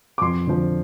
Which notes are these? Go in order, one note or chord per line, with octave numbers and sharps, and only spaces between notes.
D6
F2 C6
D3 F3